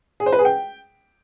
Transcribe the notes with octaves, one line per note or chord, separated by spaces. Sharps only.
G#4
C5
B4
G#4
G5